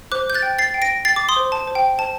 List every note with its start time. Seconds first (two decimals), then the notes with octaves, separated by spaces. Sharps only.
0.12 C5 D6 F#6
0.30 G6
0.34 F#6 A6
0.42 G5
0.59 A6 C7
0.74 G5
0.82 A#6 D7
1.05 G5 A6 C7
1.16 D6
1.29 C6 D#6
1.36 C5
1.52 A5
1.67 C5
1.75 G5
1.98 C5 A5